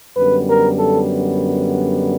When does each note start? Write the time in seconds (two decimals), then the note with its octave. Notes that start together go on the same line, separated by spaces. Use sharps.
0.16 F#2 D3 G3 B3 B4
0.48 A#4
0.78 A4